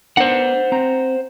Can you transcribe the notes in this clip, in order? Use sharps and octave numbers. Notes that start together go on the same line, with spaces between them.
B3 D4 A#4 C5 F#5
C4 A#5